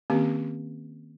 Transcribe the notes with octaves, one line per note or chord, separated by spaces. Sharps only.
D#3 A#3 C4 C#4 G4